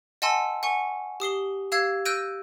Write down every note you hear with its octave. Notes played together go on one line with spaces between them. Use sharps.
D#5 F#5 G#5 A5 C6 E6
F#5 G#5 C#6
G4 D#6 C7 G7
G4 F5 E6 G#6 C7
E6 F#6 G6 A#6 D7 D#7